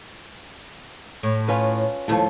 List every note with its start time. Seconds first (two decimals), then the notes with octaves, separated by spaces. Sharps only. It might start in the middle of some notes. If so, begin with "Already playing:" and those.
1.23 A2
1.48 C#4 F4 B4
2.08 D#2 A2 F3 A3